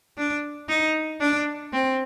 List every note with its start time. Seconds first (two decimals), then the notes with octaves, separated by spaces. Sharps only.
0.18 D4
0.69 D#4
1.21 D4
1.73 C4